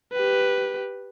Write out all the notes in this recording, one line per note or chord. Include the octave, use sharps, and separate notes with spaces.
G4 B4